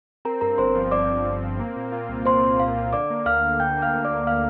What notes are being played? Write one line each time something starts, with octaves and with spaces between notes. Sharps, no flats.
C4 A#4 A#5
G2 A#4 A#5
G1 C5 C6
F3
C4 D5 D6
G1
G1
C4
A#3
A#2
F4
C2
C2 C5 C6
F4
C2 F5
F4
D3 D5 D6
A#3
D2 F5 F6
D2
D3 G5 G6
A#3
F5 F6
D2
D5 D6
D2
F5 F6